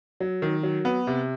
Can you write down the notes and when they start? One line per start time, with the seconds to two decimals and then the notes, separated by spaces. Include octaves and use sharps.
0.20 F#3
0.42 D#3
0.63 F#3
0.85 B3
1.07 C3